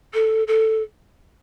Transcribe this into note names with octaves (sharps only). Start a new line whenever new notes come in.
A4
A4